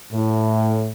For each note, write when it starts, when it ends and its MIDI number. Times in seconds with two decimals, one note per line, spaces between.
0.12 0.92 45